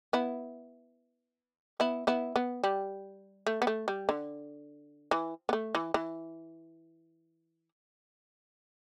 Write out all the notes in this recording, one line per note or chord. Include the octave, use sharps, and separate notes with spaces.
B3 E4
B3 E4
B3 E4
B3
G3
A3
B3
A3
G3
D3
E3
B3
A3
E3
E3